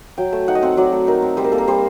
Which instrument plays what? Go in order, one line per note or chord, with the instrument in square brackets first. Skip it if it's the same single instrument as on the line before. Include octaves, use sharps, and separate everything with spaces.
[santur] F#3 G5
A3
D#4 F#5
D#5
C4 F#5
F#3 D5
A3
D#4 A#4
C4
G3 C5
A#4
A#3 A4
A#4
G3 C5